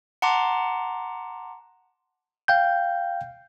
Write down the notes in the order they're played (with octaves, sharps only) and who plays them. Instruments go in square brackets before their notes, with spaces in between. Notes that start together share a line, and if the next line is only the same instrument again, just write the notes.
[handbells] F#5 A5 A#5 C6 D6
[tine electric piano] F5 G5 G6